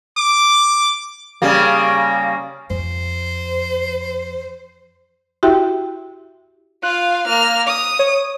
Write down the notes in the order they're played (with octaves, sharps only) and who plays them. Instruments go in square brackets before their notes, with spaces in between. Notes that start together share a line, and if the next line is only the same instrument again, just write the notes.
[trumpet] D6
[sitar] C#3 G3 A#3
[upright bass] F2 [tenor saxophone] C5
[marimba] E4 F#4 G4 E5 G5 C6
[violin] F4 F5 [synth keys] F#6
[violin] A#3 F6
D#6
[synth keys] C#5